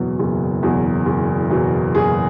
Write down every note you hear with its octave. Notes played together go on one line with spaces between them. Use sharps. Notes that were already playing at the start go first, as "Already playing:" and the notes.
Already playing: F#1 E2 B2 F#3
F#1
E2 B2 F#3
F#1
E2 B2 F#3
F#1 G#4